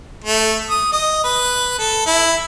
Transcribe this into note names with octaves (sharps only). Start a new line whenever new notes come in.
A3
D#6
D#5
B4
A4
E4